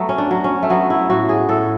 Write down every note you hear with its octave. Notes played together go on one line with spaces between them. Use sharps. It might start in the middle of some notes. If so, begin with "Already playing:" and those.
Already playing: F#3 A3 B3
C#4
D4
F#3
C#4
A3
F#3 B3
E4
A2 F#4
G#4
A2 A4